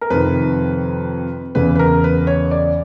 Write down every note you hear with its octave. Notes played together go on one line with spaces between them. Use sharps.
A#4
F2 C3 D#3 B4
E2 C#3 E3 B4
B4
A#4
B4
C#5
D5